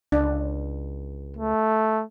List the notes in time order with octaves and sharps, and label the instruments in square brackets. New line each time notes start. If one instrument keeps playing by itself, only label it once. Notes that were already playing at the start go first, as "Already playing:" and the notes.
[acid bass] C#2 [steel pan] D4
[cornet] A3